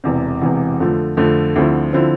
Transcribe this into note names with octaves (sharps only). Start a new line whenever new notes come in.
E1 E2 C3
E1 E2 C3
F2 D3 F3 A3
F2 D3 F3 A3
D2 D3 F3 C4 E4
D3 F3 C4 E4